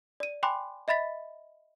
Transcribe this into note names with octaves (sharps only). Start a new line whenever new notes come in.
D5 D#7
G5 G#5 B5 C6 D6 F#6
D#5 E5 B5 A6 B6